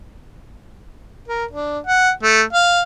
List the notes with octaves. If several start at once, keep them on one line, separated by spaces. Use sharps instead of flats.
A#4
D4
F#5
A3
F5